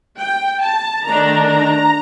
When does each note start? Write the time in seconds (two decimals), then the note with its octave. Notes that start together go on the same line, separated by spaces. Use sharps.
0.18 G5
0.61 A5
1.05 D#3 A3 D4 A#5
1.47 A#5